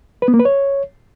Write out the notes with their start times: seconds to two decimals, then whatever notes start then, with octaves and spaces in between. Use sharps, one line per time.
0.22 B4
0.28 B3
0.34 A#3
0.39 B4
0.45 C#5